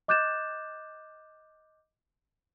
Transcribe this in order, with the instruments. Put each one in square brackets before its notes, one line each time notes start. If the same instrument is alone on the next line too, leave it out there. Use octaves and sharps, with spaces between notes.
[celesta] D#5 D6 F#6 G6 A6 E7